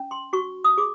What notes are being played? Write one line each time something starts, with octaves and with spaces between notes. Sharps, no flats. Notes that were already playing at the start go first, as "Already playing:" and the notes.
Already playing: C#4
C6
F#4 C#6
D#6
G#4 D6